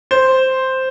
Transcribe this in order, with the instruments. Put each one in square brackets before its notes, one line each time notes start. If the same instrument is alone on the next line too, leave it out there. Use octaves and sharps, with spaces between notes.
[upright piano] C5